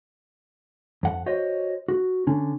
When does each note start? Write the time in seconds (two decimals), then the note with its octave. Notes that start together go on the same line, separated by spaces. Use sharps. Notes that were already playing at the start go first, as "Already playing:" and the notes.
1.03 F2 F#5
1.26 F#4 C5 C#5 D#5
1.88 F#4
2.27 D3 C#4